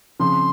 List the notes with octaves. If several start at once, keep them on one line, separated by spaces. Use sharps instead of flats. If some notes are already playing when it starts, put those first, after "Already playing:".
C#3 F3 C4 C6